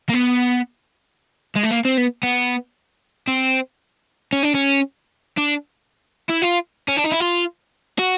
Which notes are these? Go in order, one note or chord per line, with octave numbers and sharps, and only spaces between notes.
A#3
B3
G#3
A3
A#3
C4
B3
B3
C4
C#4
D4
C#4
D4
E4
F4
C#4
D4
D#4
E4
F4
F#4